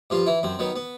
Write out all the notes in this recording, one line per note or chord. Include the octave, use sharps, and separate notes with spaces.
G2 F3 F4
E3 E4
F#2 C4
D#3 F#3 B3
B3